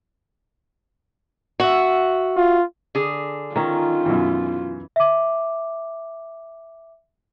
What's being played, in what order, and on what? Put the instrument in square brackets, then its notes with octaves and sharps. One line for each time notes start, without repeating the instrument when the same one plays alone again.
[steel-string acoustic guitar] F#4 E5
[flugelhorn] F4
[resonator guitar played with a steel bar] D3 G#4
[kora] D#3 C#4 [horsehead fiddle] F4
[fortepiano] F#2 B2 D#3 [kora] E3
[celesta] E5 D6